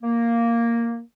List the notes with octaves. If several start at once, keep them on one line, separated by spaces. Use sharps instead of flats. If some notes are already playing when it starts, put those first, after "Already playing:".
A#3